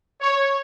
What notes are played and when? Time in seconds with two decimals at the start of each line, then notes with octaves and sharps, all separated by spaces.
0.21 C#5